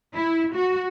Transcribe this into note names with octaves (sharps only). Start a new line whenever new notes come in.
E4
F#4